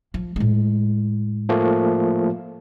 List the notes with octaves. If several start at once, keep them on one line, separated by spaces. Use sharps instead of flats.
F3
A2 G#3
F3 A3 A#3